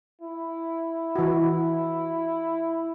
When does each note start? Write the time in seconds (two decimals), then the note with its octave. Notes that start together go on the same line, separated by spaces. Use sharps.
0.22 E4
1.16 E3 F#4